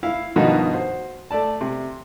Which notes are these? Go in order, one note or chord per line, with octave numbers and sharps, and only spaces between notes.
E4 F5
G2 B2 D#3 F3 D#4 F#4
F#4 C5
A3 D5 A5
C3